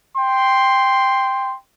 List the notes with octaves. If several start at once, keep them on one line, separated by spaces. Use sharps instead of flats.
G5 C6